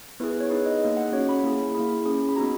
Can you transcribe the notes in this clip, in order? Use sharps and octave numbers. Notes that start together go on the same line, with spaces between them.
B3 E4 G#4 B4
B4
C#5
B3 D#4 G#4 B4
D#5
A#3 D#4 G#4
F#5
C#4 F#4 C#5
B5
A#3 E4 G#4
A#3 E4 G#4 B5
C#4 G#4
B5
B3 D#4 F#4 A#5